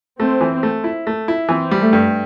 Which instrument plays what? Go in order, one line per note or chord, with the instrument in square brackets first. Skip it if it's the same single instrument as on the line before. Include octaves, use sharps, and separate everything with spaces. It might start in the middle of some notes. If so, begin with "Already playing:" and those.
[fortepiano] A3 [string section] C4
[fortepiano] E3
A3
E4
A3
E4
[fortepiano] E3 [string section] C4
[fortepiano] G3
[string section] A3
[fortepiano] G2